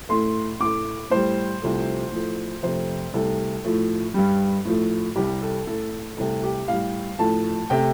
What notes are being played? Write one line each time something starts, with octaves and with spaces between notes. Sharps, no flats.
A2 A3 C6
A2 A3 D6
A2 G3 C5
C2 C3 F3 A3
A2 F3 A3
F2 C3 A3 C5
C2 C3 A3 A4
A2 F3 A3
G2 G3
A2 F3 A3
C2 C3 G3 G4
A4
A2 A3 A4
C2 C3 A3 A4
G4
A2 G3 F5
A2 F3 A3 A5
C3 A3 G5